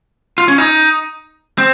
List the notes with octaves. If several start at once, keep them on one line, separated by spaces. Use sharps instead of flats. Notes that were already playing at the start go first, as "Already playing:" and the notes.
F4
C#4
D#4
C4